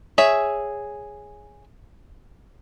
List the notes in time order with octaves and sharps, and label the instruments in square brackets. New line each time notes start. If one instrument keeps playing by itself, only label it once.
[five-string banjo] G#4 C#5 E5